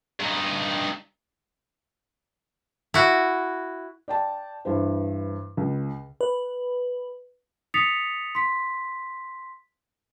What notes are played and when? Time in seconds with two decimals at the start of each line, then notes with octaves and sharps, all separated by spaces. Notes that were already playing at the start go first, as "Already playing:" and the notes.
0.20 G2 D#4
2.94 E4 F#4
4.08 D5 G5 A5
4.65 G2 E3 C5
5.57 C#2
6.21 B4
7.74 D#6 A6 B6 C#7 F7
8.35 C6 B6